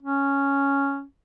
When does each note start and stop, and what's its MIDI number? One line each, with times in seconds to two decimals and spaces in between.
0.03 1.03 61